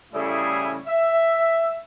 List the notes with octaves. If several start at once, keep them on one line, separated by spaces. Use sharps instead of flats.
A2 C#3 G3 A3 E4 G#4
E5